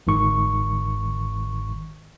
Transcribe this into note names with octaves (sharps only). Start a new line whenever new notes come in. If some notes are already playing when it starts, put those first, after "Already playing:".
G1 G#2 D#3 C#6